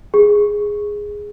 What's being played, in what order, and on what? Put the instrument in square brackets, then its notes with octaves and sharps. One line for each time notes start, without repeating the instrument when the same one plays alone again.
[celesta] G#4